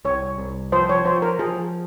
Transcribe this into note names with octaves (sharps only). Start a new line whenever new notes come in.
C2 C#5
C2
F3 C5
C#5
F3 C5
A#4
F3 G#4